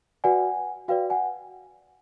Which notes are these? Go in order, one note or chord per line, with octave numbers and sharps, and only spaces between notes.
F#4 B4 D5 F#5 G#5
F#4 B4 D5 F5 G5
F#5 G#5